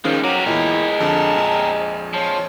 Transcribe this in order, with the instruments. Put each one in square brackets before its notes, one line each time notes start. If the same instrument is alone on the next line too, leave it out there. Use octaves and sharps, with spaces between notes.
[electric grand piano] D#3 C#4 G#4 [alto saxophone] F3 [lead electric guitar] G3 G#3
[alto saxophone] F#3 [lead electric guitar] G4 A#4 [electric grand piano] D6
[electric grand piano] E2 A#2 [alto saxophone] G#3 [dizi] E4
[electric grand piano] F2 D3 [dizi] A5
[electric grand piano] A#1 F2
[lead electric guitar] F3 [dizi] C#5